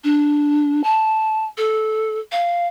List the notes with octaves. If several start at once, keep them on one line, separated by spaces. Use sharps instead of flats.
D4
A5
A4
F5